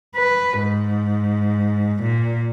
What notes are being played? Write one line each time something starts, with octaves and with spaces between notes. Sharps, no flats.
B4
G#2
A#2